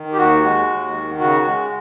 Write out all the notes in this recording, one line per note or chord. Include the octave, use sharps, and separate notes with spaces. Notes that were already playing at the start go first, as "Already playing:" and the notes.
Already playing: D#3
G4
D#2 F#4
G#3
D#2
D#3
C#3 F#4
G#3